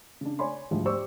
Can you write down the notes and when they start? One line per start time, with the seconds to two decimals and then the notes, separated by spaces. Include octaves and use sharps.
0.21 C#3 D4
0.39 C#5 D5 G#5 B5 C6
0.71 D2 G#2 F3 G3
0.86 G4 C5 D5 C#6 D6 E6